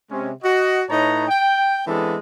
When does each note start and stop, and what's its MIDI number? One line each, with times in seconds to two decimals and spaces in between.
0.10 0.31 48
0.10 0.31 56
0.10 0.31 61
0.43 0.80 66
0.43 0.80 75
0.90 1.28 45
0.90 1.28 63
0.90 1.28 71
0.90 1.28 73
0.90 1.28 81
0.90 1.28 82
1.28 1.81 79
1.87 2.17 52
1.87 2.17 56
1.87 2.17 59
1.87 2.17 60
1.87 2.17 62
1.87 2.17 69